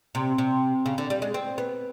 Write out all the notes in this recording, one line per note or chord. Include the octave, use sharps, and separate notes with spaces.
C3
C3
C#3
D3
G3
G#3
C4
B3